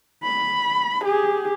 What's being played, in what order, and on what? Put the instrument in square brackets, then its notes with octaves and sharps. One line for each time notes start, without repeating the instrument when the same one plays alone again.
[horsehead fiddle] B5
G4 G#4